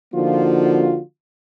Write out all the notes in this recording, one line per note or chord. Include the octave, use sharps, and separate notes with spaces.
D3 F3 A#3 D#4 F4 F#4